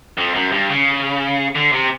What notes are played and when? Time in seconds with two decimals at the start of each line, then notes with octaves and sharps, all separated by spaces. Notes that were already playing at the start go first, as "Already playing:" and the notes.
0.18 F2
0.35 F#2
0.52 G2
0.70 C#3
1.55 D3
1.72 C3